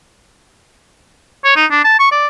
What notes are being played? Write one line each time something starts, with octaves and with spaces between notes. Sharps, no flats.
C#5
D#4
D4
A5
C#6
D5